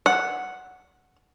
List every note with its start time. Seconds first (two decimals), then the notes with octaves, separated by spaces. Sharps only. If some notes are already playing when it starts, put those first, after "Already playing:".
0.06 F#5